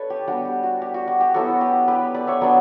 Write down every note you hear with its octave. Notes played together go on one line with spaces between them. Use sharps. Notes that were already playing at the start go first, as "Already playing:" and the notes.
Already playing: D4 A4 B4 C#5
G4
G3 B3 D4 F#4
G4
F#4
G4
F#4
F#4
G4
F#3 B3 E4 F#4 A4
G4 B4
G4 B4
B4 D5
C#5 E5
F#3 B3 D4 B4 D5